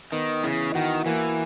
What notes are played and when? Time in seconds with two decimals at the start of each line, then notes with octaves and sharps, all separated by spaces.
0.12 D#3 B3
0.44 C#3 E3
0.74 D#3 F#4
1.06 E3 A#3